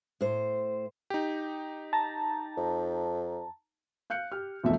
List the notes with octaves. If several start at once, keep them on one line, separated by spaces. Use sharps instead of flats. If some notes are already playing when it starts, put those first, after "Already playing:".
A2 C5
D#4 G4
A5 A#5
F2
F5 F#6 G6 C#7
G4 F6
E1 B1 F2 A3 E5